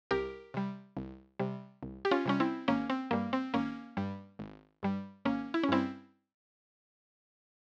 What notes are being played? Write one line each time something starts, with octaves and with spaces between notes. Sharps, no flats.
C2 G4 A#4
C3 G3
C2
C3 G3
C2
G4
C#4 F4
C3 G3 C#4
C4 E4
G#1 A#3 C#4
C4
G2 G3 A#3
C4
G#1 A#3 C#4
G2 G3
G#1
G2 G3
G#1 A#3 C#4
E4
C#4
G2 G3 C4 E4